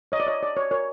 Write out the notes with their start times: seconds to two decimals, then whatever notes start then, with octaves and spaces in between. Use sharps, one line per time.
0.12 C#5 D#5
0.20 D5
0.27 C#5 D#5
0.41 C#5 D5
0.57 C#5
0.71 A#4 C#5